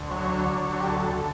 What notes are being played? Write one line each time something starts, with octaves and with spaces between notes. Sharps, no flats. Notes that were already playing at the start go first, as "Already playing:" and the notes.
Already playing: D2
F#3 C#5
D3
D3
F#3
G4
D2 A4
D2